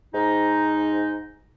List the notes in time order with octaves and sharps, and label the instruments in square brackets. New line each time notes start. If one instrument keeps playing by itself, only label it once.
[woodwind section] G#2 D#4